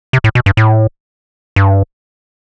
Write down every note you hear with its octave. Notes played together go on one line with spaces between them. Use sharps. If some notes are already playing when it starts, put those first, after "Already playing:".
C3
A2
B2
G2
A2
G2